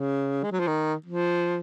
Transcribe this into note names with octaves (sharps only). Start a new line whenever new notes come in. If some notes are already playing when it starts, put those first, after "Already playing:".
Already playing: C#3
G#3
F#3
F3
D#3
F3